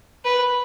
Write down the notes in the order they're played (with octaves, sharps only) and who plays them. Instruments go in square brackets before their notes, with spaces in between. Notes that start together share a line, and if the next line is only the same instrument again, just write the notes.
[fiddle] B4